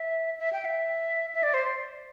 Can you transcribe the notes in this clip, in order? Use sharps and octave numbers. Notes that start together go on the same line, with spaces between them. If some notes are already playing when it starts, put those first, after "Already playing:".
Already playing: E5
E5
G5
E5
E5
D5
C5